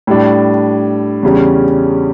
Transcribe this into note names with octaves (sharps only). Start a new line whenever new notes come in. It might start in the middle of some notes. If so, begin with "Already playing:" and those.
A2 G3 D4
E2 C#3 G3 C#4